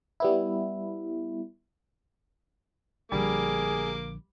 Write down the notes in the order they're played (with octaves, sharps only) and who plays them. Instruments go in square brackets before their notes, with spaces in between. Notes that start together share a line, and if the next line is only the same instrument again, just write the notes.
[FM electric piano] G3 B3 E4
[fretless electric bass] A#1 D3 F3 [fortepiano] G3 [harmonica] A#3 D6 [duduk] G#4